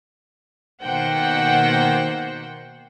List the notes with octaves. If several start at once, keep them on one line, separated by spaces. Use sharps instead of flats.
B2 D#3 A#3 C5 F#5 G5